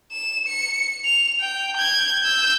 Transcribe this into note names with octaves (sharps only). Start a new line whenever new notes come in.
E7
C#7
F7
G5
G6 G#6
E6 G6